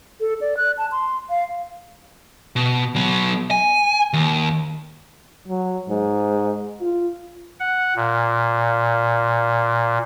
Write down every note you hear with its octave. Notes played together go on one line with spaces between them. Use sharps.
A4
D5
F#6
A5
C6
F5
B2
F#3 B3
G#5
D#2
F#3
G#2
F4
F#5
A#2